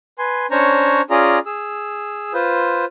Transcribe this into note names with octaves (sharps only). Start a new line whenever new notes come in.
B4 G#5 C6
C#4 D4 C5 C#5 A#5 C#6
C#4 F4 G#4 D5 A#5
G#4 E6
F4 B4 C5